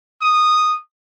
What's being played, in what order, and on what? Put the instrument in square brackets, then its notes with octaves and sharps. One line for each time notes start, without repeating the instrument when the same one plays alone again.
[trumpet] D#6